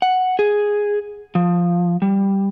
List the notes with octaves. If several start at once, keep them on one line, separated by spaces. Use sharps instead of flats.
F#5
G#4
F3
G3